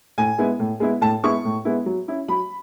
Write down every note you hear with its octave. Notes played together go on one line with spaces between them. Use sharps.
A2 G#5
G#3 B3 E4
A2
G#3 B3 E4
A2 A5
G#3 B3 E4 C#6
A2
G#3 B3 E4
F#3
C#4 E4
F#3 B5